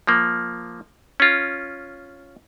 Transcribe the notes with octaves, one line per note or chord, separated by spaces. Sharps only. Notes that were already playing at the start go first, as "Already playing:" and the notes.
F3 A#3
C#4 F4